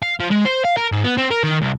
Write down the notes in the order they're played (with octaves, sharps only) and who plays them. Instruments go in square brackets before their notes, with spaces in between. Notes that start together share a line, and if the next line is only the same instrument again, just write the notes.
[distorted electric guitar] F5
F3
G#3
C5
F5
A#4
G#2
B3
C4
A#4
D#3
C2